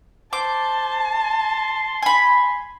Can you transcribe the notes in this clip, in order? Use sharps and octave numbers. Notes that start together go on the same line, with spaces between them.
C5 A5 D6
C6
G#5 B5